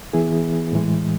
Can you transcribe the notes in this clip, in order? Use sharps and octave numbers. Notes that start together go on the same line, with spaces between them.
E3 B3 E4 G#4
A2 E3 G#3